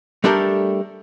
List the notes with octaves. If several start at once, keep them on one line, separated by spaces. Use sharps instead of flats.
G3 A3 D4 G4 A4 A#4